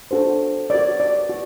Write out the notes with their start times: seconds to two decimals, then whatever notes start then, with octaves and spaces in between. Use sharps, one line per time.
0.11 D4 F#4 A4 C5
0.70 F#4 A#4 C#5 D5
1.00 D5
1.29 F#4